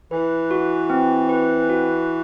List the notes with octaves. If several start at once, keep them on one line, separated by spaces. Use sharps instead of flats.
E3 B4
F#4
C4
B4
F#4